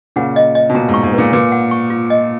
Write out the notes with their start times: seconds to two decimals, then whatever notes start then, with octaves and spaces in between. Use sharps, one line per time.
0.16 A#2 C#3 F#5
0.36 D#5
0.55 D#5
0.69 B2
0.75 A#2 A#5
0.88 G#2
0.94 C#6
1.03 G#2
1.13 A#2 B4
1.33 A#2 B4
1.52 F#5
1.71 C#6
1.90 F4
2.10 D#5